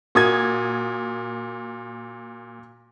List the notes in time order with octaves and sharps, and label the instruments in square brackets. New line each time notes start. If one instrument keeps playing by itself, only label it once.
[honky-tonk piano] A#2 D#6 G#6 [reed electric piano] F#4 A#4